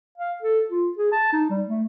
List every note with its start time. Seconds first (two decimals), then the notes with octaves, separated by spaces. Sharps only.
0.18 F5
0.42 A4
0.70 F4
0.98 G#4
1.12 A5
1.33 D#4
1.50 G3
1.68 A3